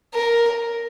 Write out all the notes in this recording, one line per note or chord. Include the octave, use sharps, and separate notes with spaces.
A#4